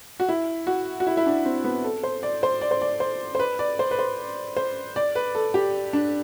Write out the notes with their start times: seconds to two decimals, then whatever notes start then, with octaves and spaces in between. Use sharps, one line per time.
0.20 F#4
0.29 E4
0.67 F#4
1.00 F#4
1.07 E4
1.17 E4
1.26 D4
1.45 C4
1.64 B3
1.84 A4
2.03 C5
2.23 D5
2.43 C5
2.61 D5
2.71 C5
2.81 D5
3.00 C5
3.35 C5
3.39 B4
3.59 D5
3.79 C5
3.91 B4
3.99 C5
4.57 C5
4.96 D5
5.15 B4
5.35 A4
5.54 G4
5.93 D4